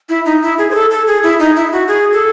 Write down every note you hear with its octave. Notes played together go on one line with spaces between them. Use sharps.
E4
D#4
E4
G#4
C5
A4
A4
G#4
E4
D#4
E4
F#4
G#4
A4